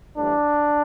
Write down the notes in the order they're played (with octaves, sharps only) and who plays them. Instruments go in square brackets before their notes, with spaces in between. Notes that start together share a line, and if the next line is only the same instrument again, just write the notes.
[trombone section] A2 E3 G3 D4